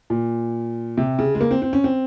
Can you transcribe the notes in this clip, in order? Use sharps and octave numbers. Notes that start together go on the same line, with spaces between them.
A#2
C3
C#3
G#3
A#3
C4
C4
C#4
C4